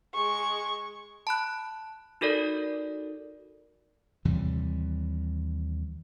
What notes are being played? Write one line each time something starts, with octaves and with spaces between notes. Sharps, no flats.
G#3 C#6
A5 B5 F#6
D#4 F#4 A4 A#4 D5
D#2 C3 E3 G3